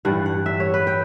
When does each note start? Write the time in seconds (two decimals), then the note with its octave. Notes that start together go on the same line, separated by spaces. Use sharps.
0.05 G2 E3 G3 F#5
0.26 F#5
0.46 E5
0.60 C#5
0.74 B4
0.87 G5